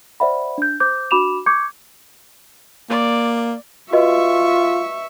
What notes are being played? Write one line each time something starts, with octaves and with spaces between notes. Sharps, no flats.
C5 D5 E5 F#5 B5
D4 G6
C5 D6 G6
D4 F#4 B5 D6 E7 F7
C#6 D6 G6 G#6 C#7
A#3 D5
F4 F#4 B4 D#5 E5 C#6